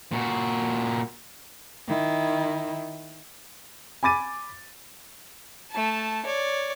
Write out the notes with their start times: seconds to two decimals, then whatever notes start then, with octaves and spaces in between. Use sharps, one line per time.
0.12 A#2 F#4
1.87 D#3 E4
4.03 G#5 B5 D6 A6 D#7
5.71 A3 A5
6.25 C#5 D5